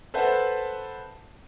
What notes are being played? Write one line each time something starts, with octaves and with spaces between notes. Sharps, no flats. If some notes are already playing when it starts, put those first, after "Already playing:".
A4 B4 C5 E5 F#5 A5